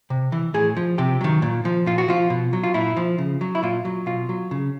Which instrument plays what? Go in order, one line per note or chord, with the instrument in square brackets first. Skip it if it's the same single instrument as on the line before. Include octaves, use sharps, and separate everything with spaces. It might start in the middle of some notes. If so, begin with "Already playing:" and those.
[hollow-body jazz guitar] C3
E3
A2 G#4
F3
C3 G4
D#3 F#3
A#2
F3
A#2 F4
F#4
F3 F4
B2
F#3
F4
A#2 E4
F3
C#3
F#3
E4
A#2 F4
F#3
B2 F4
F#3
C#3